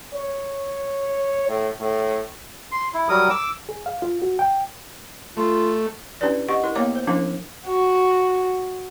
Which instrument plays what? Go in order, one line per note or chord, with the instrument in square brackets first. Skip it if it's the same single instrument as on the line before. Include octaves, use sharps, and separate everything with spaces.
[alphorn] C#5
A2
A2
[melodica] C6
E4
F#3 G3 A#4 D#6
D6 E6
[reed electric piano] G#4
F5
F4
F#4
G5
[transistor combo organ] A3 [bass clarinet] F4
[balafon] C#4 D4 E4 G4 B4 D5
G4 D#5 F#5 C#6
E4 A#4
A#3 B3 C#5 F5 A#5 D6
C5
F3 C#4 D4 E4 A#4 F5
[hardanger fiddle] F#4